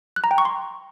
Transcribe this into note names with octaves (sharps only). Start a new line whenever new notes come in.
F#6
A#5
G5
C#6
C6